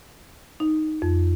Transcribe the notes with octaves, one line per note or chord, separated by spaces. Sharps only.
D#4
F2